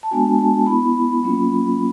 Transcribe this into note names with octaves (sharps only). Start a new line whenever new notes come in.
A5
G#3 B3 D4 F#4 G#5
A5
B3 E4 B5
F#3 A#3 C#4 F4